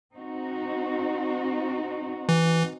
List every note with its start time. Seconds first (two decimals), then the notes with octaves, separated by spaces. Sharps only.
0.15 C4 D#4 F#4
2.29 E3